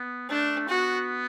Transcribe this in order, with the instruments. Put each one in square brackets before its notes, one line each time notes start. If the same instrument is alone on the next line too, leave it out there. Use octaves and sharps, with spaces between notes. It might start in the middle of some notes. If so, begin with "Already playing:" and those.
Already playing: [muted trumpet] B3
[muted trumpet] A3 [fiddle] D4
[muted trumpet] B3 [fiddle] F#4